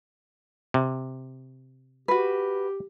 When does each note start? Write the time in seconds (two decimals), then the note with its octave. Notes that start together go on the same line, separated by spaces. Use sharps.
0.74 C3
2.08 F#4 G4 B4